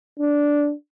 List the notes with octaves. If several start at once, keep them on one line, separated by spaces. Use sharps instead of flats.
D4